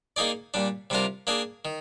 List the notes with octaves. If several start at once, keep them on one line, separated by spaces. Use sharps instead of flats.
A#3 D#4 G#4 D5
A#2 G3 D4
C3 G3 D4 F4 A#4
A#3 D4 G#4
D#3